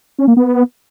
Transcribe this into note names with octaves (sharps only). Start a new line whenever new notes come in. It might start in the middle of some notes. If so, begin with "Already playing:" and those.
C#4
A#3
B3